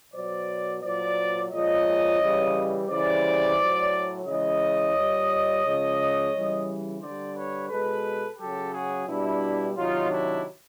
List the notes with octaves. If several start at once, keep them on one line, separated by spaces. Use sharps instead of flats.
B2 F#3 C5 D5
A#2 F#3 C5 D5
A#2 F3 G#3 C#5 D#5
C#3 E3 G3
C#3 E3 G3 C5 D5
A2 F#3
C#3 E3 G#3 C#5 D#5
A#2 G3
C#3 F3 G#3
C#3 E3 G3
D3 G3 C5 D5
B4 C#5
B2 G#3 A4 B4
C#3 F#3 G4 A4
F#4 G#4
B2 G3 D4 E4
C3 D#3 F#3 D#4 F4
D4 E4